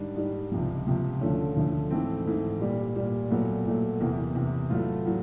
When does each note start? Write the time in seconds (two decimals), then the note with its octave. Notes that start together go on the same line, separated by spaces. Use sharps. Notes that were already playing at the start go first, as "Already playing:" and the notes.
Already playing: G#2 D#3 G3 D4
0.16 G#2 D#3 G3
0.52 C#2 C3 F3
0.87 C#2 C3 F3
1.21 D2 D3 F3 A3 C#4
1.57 D2 D3 F3 A3
1.91 G#2 E3 A3 C4
2.26 G#2 E3 A3
2.61 A#2 G3
2.96 A#2 G3
3.30 A#2 F#3 A3 B3
3.65 A#2 F#3 A3
4.00 E2 C3 E3 A#3
4.35 E2 C3 E3
4.70 A2 F#3 A3 F4
5.05 A2 F#3 F4